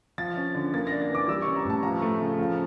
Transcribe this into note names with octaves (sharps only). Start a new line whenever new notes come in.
F3 A6
C#4
D3
A#3 A6
A#6
D4
A6
E3
D6
G3 E6
C#4 C#6
A#5
A2 A5
F3 A#5
A3
C#3
F3